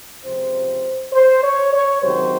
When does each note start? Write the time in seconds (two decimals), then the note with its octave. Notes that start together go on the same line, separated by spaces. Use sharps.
0.24 C#2 C3 F3 C5
1.13 C5
1.43 C#5
1.73 C#5
2.02 C#2 C3 D#3 F#3 C5